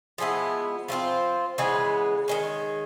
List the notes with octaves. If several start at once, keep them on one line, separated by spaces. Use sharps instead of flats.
F3 G#3 B3 E4
F3 A3 C4 F4
C#3 E3 G#3 B3
D#3 G#3 C#4